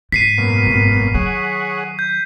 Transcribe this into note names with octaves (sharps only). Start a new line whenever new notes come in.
G#2 B6 C7 D#7
F#2 B2 A#3
G#1
D#3 F#3 G#4 C#5 F#5
G6